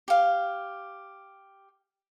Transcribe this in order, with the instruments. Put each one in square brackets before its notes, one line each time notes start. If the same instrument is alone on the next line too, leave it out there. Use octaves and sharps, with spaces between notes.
[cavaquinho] G4 F5